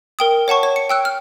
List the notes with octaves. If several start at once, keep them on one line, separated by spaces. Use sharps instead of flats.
A#4 G5 D#6
C#5 F#5 A5 C#6
C#5
C#7
G5 E6 F#6
F6